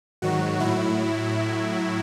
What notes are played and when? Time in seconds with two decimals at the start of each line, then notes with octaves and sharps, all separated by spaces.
0.22 G#2 D#3 F#3 F#4
0.60 A2 F#3 E4